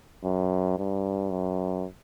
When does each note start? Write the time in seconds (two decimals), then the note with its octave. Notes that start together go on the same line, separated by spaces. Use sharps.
0.24 F#2
0.78 G2
1.30 F#2